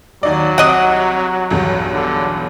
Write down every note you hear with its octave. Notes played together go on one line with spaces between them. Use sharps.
D#2 F#3 D#4 D5
C2 D#5 F#5 D6 D7
B1 E2 G2
D3